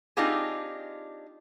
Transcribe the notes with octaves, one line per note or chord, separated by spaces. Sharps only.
C4 D4 D#4 F4 G4 G#4